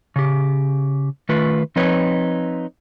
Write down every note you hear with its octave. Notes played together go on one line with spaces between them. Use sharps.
C#3 G4
D#3 A3 F4 B4
F3 C4 D#4 B4 C#5